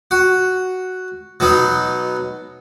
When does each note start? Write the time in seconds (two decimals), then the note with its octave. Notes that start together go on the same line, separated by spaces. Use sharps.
0.11 F#4
1.40 B2 F#3 D#4